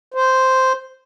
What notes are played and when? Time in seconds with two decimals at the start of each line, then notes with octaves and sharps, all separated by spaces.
0.14 C5